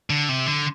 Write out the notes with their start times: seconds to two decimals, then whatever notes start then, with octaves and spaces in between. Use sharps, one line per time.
0.10 D3
0.29 C3
0.46 D3